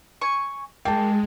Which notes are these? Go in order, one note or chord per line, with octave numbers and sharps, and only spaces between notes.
G#5 C#6
G#3 A#3 G5 A5